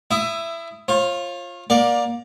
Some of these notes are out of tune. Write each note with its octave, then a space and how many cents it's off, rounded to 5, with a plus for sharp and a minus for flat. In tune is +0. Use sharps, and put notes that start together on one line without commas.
E4 +10 E5 +20 D#6 +0
F4 +0 C#5 -45
A#3 +25 D5 +0 F5 +35